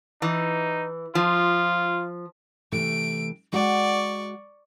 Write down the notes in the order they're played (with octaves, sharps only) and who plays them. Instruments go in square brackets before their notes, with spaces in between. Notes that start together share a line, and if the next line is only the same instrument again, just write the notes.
[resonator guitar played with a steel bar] E3 [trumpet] D#4
[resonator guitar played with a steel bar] F3 [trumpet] F4
[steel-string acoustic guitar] C3 E3 A3 [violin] D7
[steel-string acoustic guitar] G#3 F#4 F#5 [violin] D5 C#6